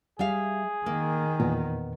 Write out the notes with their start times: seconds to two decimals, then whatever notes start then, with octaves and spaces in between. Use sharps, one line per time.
0.19 G3 G#4 E5 F5
0.86 D#3 A#3
1.40 E2 A#2 B3